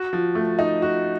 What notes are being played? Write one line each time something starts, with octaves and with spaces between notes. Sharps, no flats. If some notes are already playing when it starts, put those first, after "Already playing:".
Already playing: F#4
F3
A3
D#4
F#4